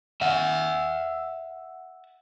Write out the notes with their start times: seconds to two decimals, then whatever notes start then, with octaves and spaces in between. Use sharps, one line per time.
0.21 E5 F#5